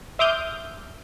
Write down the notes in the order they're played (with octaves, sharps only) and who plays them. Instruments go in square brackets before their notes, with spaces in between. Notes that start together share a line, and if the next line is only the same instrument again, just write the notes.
[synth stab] E5 C6 D6 D#6 F6 G6